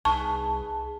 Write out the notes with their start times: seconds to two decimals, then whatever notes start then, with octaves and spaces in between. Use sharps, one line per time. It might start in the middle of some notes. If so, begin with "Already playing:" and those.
0.05 C2 D#4 G#4 B4 A5 C#6